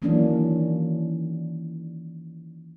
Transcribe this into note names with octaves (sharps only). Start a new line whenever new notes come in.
D#3 E3 F#3 A#3 C#4 D4